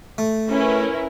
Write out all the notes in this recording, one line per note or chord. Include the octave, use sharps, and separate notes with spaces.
A3
C#4 E4 A#4 B4